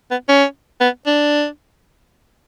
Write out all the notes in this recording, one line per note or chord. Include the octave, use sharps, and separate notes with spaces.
B3
C#4
B3
D4